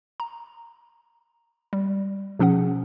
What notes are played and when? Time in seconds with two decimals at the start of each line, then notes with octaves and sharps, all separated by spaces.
0.20 A#5
1.73 G3
2.39 B2 F3 C#4 G#4 F#5